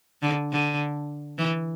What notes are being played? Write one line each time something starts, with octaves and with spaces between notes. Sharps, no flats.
D3
D3
E3